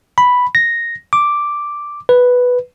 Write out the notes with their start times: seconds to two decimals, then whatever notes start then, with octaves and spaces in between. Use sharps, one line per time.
0.18 B5
0.55 A#6
1.13 D6
2.09 B4